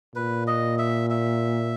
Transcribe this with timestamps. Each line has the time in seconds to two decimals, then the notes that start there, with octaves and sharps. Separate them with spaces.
0.15 A#2 B4
0.47 D#5
0.78 E5
1.10 E5